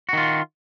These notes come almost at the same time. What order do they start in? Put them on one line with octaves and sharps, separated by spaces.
F#4 D#3 F4